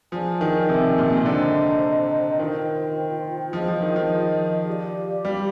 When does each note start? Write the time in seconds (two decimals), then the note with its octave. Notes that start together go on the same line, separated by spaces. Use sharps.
0.12 F3 G#4 D5 G#5
0.41 D#3
0.69 C3
0.98 A#2
1.12 C3
1.25 D3 C5 D#5 A#5
2.39 D#3 F4 C5 G5
3.53 F3 F4 G#4 D#5
3.68 F3
3.82 D#3
3.96 F3
4.67 G4 D5 F5
5.25 G3